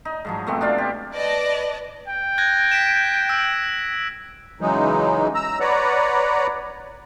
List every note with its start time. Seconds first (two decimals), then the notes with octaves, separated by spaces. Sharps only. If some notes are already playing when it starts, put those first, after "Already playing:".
0.05 D#4
0.25 G#2 F3 F#3
0.47 B2 A3 C4 F#4
0.61 D4 F4 D5 F5
0.78 G4
1.14 B4 D5 D#5 A5 A#6
2.08 G5
2.38 F#6 G#6 A#6
2.72 B6 D7 E7
3.29 E6
4.61 C#3 E3 F#3 G#3 D#4
5.35 A#5 E6
5.60 B4 C#5 D5 F#5 A#5